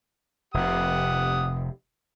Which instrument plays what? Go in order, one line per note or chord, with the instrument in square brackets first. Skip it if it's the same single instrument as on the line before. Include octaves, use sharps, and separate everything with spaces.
[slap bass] F1 C3 [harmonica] G4 F#5 D#6